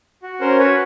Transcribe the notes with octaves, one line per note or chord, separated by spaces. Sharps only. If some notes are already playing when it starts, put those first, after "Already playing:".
F#4
C#4 A#4 C5
F#4 B4 C#5